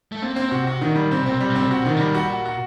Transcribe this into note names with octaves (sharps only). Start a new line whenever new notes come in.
A3
A#3 C4
C4
C3 F#4
F#4
A#2 D#3
G3
A#2 C4
C3
A#2 C4
C3
A#2 G3
C3
A#2 C4
C3
A#2 F#4
C3
A#2 D#3
C3
G3
A#2
F#4
F#4
F#4